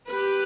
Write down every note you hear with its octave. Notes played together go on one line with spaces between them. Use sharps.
G4 B4